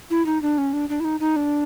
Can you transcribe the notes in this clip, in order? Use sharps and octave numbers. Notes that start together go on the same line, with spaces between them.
E4
D#4
D4
C#4
D4
D4
E4
D#4
D#4
D4